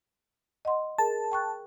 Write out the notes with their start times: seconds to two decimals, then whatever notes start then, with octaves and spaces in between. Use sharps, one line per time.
0.65 D#5 F#5 C6
0.98 G#4 A#4 A5
1.32 G5 C#6 F#6